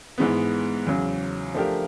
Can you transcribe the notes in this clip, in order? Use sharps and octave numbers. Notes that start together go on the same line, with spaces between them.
G#2 E3 G#3 B3
E2 C#3 F#3
F3 A3 D4 G4 A#4